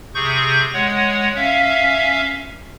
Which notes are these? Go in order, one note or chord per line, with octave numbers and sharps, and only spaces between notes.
C3 G#4 C#6 G6
G#3 C#5 F#5
C#4 E5 F5